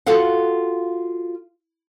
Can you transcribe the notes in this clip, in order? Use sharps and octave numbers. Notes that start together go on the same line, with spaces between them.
F4 F#4 A4 F5 F#5